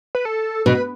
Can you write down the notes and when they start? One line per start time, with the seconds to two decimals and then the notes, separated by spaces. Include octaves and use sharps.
0.15 B4
0.25 A4
0.66 B2 B4